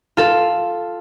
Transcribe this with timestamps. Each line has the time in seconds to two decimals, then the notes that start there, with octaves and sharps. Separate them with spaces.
0.17 F4 A4